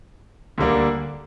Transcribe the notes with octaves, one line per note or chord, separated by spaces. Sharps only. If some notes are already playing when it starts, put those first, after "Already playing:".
D2 D3 G3 A#3 D4